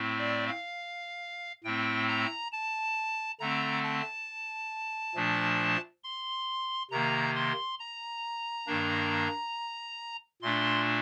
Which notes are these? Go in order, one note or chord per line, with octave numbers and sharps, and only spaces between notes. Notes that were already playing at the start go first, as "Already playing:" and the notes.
Already playing: A2 A3 C4
D5
F5
A2 A3 C4 G5
A#5
A5
D3 A3 C4 A#5
A5
A#2 F3 A3 D4
C6
C3 D#3 A#3 A#5
C6
A#5
G2 D#3 A#3 D4
A#2 A3 D4 C6